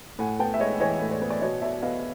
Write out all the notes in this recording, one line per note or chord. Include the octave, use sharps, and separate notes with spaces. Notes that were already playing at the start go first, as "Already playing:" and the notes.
A2 F#5 G#5
B3 G5 A5
E5
G#3 C#5 D#5
E3 C#5 D#5
A2
C5 D5
B3
D5
B2 C#5 D#5
B2 D5 E5
B3 D#5 F5